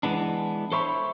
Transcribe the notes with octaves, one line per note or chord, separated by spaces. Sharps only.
E3 G#3 B3 D4
A4 C5 C#5 E5 B5